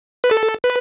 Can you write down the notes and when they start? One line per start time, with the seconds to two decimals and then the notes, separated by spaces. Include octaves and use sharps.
0.24 B4
0.31 A4
0.64 B4